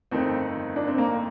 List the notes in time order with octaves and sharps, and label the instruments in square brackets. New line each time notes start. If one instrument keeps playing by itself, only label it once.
[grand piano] G1 F2 D#3 A3 D#4 [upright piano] C4
[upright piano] D4
C4
A#3